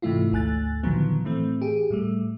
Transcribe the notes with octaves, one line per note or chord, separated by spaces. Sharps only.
G#2 C3 E3 A3 E4 F4
G#1 D2 A3 G#5 F#6 A6
A#2 D3 D#3 F3 F#3 B3
A2 E3 A3 C4
G4 G#4
A2 G3 A3